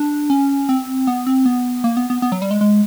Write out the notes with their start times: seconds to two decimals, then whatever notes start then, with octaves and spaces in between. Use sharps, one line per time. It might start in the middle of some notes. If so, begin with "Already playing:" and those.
Already playing: D4
0.30 C#4
0.69 C4
1.07 B3
1.27 C4
1.45 B3
1.84 A#3
1.97 B3
2.10 B3
2.22 B3
2.32 F#3
2.42 G3
2.51 G#3
2.61 G#3